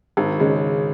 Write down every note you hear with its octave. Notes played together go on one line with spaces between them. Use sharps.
G#1
C#3 G#3